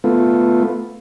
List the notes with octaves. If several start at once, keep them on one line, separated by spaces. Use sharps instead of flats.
A3 B3 F4